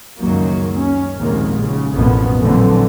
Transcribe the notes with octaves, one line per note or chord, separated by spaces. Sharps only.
C#2 F#2 D#3 F#3 A#3
C#4
A#1 D#2 G#2 C3 D#3 A#3
C#2 C#3
A1 F2 B2 F3 A#3 B3
A#2 D3 E3 F#3 A3 C4